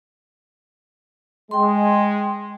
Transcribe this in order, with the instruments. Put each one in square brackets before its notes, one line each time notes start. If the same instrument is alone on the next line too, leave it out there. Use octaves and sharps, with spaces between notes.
[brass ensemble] G#3 [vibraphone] G5 C6